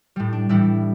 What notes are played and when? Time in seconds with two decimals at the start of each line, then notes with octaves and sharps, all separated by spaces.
0.16 A2 G3
0.33 D4
0.49 A2 E3 G3 E4